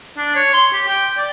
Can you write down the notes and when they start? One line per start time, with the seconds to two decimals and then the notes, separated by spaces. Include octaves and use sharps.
0.17 D4
0.35 C#5
0.54 C6
0.73 G4
0.88 G5
1.18 D5